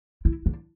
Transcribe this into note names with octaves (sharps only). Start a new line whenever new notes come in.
E4
D4